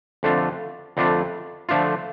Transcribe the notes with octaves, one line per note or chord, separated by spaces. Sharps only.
F2 D3 A3 D4 F4
F2 D3 A3 D4 F4
D3 F3 A3 D4 F4